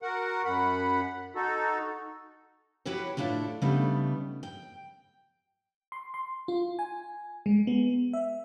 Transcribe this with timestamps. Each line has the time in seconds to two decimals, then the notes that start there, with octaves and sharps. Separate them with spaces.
0.02 F#4 A#4 F#5
0.45 F#2 F#5 B5
1.35 D#4 F#4 A4
2.85 E4 F#4 G4 B4 C#5
3.17 A2 A3 D4 E4 F4
3.62 C#3 G3 A3 B3 D4 D#4
4.43 G5
5.92 C6
6.14 C6
6.48 F4
6.79 G#5
7.46 G#3
7.67 B3
8.13 E5